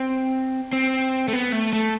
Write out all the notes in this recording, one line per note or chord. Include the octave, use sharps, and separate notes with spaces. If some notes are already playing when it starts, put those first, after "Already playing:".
Already playing: C4
C4
A3
B3
A3
A3